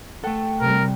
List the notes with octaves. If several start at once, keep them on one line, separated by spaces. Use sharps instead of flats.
A3 A4 F#5 G5
C3 G3 A#4